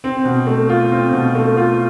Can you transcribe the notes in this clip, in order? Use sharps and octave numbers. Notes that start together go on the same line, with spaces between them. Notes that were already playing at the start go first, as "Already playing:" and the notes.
C4
B2
A3
F4
C4
B2
A3
F4